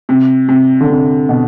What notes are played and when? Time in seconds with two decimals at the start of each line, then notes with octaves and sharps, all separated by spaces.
0.09 C3
0.49 C3
0.81 D3
0.90 C3
1.29 B2